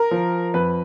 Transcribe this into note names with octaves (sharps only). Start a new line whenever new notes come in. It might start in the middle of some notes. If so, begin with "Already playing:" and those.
Already playing: A#4
F3
F2 B4